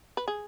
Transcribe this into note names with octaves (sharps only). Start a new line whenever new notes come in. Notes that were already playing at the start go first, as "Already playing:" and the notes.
B4
G#4